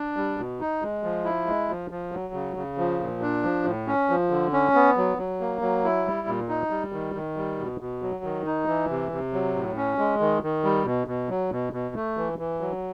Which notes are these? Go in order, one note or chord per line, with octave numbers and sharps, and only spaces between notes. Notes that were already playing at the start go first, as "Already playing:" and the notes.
Already playing: D4
G3
B2
D#4
G#3
F3
E4
G#3
F3
F3
F#3
C#3
C#3
F3
A#2
D4
F3
A2
C#4
F3
D3
C#4
B3
F#3
F#3
A#3
F#3
E4
G3
A#2
D#4
G3
D#3
D#3
G3
B2
B2
F#3
D#3
D#4
E3
C3
C3
F#3
A2
C#4
G#3
D#3
D#3
G3
B2
B2
F#3
B2
B2
A3
E3
E3
F#3